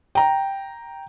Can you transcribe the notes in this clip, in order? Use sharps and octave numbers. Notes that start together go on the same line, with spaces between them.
G5 A#5